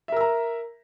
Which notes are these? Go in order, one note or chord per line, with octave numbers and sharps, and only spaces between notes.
A#4 E5 A#5 E6